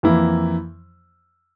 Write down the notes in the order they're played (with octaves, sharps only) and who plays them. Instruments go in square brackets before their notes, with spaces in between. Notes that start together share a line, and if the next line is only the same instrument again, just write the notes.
[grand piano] F2 E3 A#3 E4